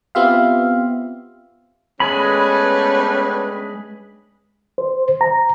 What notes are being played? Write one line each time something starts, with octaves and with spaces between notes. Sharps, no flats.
B3 C4 F4 G4 E5 F5
G2 G#3 A3 B3 C#4 G#4 B4 B5
C5
A#5